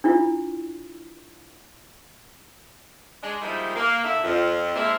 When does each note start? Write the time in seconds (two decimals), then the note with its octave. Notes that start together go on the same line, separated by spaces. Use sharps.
0.04 D4 E4 F4
3.22 G#3 D4
3.41 F3 G3 G#3 A#3 D#4 E4
3.75 A#3
4.03 D3 E4
4.23 F2
4.74 G#3 A#3 C4 D4 E4